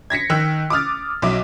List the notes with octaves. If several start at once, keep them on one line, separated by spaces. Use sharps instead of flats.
G#6 A#6 B6 C#7
D#3 G5 E6 F#6 B6
D6 D#6 F6 A6
B1 F#3 E5 D6